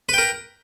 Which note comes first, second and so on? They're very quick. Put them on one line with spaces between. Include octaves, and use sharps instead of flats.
B4 G5 A#4